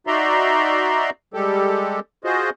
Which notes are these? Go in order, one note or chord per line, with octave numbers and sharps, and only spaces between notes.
D#4 F#4 D5 E5 A#5 C6
G3 G#3 G4 A4
F4 F#4 G#4 C5 D#5